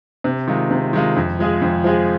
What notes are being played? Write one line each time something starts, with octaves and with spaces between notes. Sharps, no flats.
C3
D#3 G#3 F4
C3
D#3 G#3 F4
F2
F3 G#3 F4 G#4
F2
F3 G#3 F4 G#4